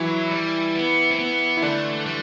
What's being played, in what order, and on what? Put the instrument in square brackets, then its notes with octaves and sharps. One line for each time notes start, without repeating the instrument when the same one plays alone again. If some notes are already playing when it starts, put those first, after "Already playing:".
Already playing: [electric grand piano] E3 E4 [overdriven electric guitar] F#3
[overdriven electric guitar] G3
B3
C4
B3
[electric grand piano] E4
[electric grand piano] D3 D4 [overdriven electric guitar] A3
[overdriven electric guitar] G3